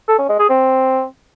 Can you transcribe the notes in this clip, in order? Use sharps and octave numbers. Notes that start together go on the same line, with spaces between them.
A4
C#4
G#3
G#4
C4